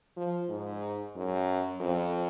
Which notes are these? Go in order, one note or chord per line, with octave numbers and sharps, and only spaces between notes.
F3
G#2
F#2
F2